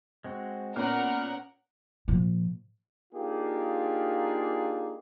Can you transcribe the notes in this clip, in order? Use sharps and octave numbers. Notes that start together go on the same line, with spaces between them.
G#3 C4 F#4
A#2 B3 C#4 A#4 F#5 F6
A#2 F3
A#3 D4 D#4 F4 G4 G#4